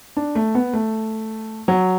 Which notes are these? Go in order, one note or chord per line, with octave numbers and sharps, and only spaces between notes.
D4
A3
B3
A3
F#3